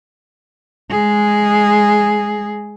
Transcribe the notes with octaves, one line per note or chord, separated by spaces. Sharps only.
G#3 G#4